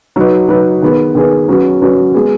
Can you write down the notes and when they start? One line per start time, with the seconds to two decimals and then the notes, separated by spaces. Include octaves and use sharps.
0.16 F#3 D#4 B4
0.48 F#3 D#4 B4
0.82 D#3 B3 G#4 B4
1.15 D#3 B3 G#4 B4
1.48 F#3 C#4 F#4 B4
1.81 F#3 C#4 F#4 B4
2.14 G#3 B3 G#4